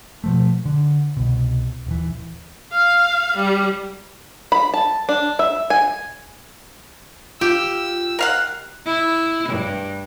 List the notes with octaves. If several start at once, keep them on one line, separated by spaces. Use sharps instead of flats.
B2 F3 A3
D3
C2 B2
D#1 E3
F5
G3
B5
A5
D4
E5
G#5
F4 G4 E6
A#4 F5 F#5
E4
G2